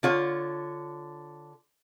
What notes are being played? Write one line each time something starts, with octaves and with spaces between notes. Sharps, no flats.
D3 F4 C#5